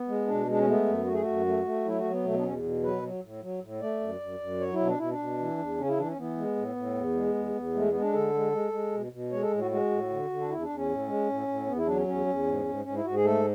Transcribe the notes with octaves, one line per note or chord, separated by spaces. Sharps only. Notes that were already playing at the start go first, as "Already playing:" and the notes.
Already playing: B3
G#3
B2 D4
G#3 D4
C#4
A3 B3
F#2
A3 F#4
G#4
F#2 F#4
A3
A3
F#3 E4
F#4
F#3
B3
B2 A3
B3 D4
E2 C#4
B2
F#3 B4
F#3
A2
F#3
A2
A3 D5
F#2
F#2
F#2
F#3 C#5
E4
B2
D4
B2 E4
D4
B2
E3
E2
C#3 C#4
E4
E3 D4
C#4
E3 B3
G#3
A2
A2
E2
G#3
E2
E2
G#3 A3
B3
G#3
D4
D3 A4
G#3
G#3
G#3
B2
B2
G#3 C#5
A4
A2
F#4
G#3 F#4
A2
D3
D3
D4
E2 E4
D4
E2
C#4
A2
G#3
A2
A2
E2 B3
E4
F#3 D4
C#4
E2 C#4
E2
G#2
G#2
G#2 C#4
E4
G#2 F#4
G#4
A3 A4